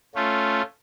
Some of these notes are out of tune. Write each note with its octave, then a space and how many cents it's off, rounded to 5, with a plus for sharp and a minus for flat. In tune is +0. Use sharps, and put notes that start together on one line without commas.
A3 +0 C#4 +0 F4 +0